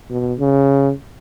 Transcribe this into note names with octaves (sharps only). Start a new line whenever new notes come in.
B2
C#3